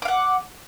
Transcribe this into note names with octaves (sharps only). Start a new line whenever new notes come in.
F5 F#5 D6